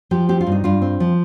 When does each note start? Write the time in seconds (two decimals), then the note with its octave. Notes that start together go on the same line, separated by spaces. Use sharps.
0.11 F3 G4
0.29 C4 G4
0.41 F4
0.47 G2
0.52 D#4
0.64 G2 F4
0.82 C4
1.00 F3